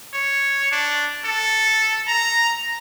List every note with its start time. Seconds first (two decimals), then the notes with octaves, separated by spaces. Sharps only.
0.14 C#5
0.72 D4
1.24 A4
2.08 A#5